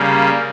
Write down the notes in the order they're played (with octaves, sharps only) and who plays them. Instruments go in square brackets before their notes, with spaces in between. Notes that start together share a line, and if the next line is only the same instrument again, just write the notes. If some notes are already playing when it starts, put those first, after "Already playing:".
Already playing: [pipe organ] C#3 G3 A#3